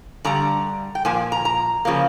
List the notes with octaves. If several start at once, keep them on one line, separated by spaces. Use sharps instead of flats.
G2 D3 G3 A#5
G5
A#2 F3 A#3 G#5
A#5
A#5
C#3 F3 A#3